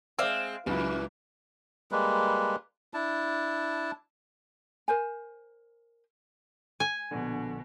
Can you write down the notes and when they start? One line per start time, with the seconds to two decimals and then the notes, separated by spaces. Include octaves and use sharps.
0.19 G#3 C4 D5 E5 F5
0.66 C#2 F#2 A#2 F#3 E4 B4
1.92 G3 G#3 A#3 B4
2.94 D4 E4 A5
4.88 A#4 C5 G#5
6.80 G#5
7.11 A#1 B2 D3